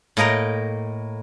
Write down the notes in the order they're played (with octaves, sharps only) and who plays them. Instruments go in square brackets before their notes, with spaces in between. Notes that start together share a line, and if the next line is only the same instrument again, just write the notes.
[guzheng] A2 A#3 D#5 G5 A#5